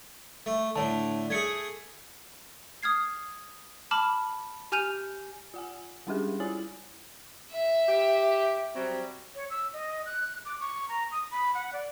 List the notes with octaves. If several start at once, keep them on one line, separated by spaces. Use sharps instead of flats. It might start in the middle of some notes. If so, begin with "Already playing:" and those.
A3
A2 D3 D4 C#5 A5
A3 G#4 G#6 C#7
D#6 F6 G#6 C7
A5 B5 D6 F6 E7
G4 G#5 F6 G6 D#7 F7
F4 F#5 G#5
G3 G#3 C#4 D4 G4 G#4
E4 F4 G#5 A6 F#7
E5
G4
F#3 G3 C4
C#5
E6
D#5
F#6
D6
C#6
A#5
D#6
B5
F#5
D5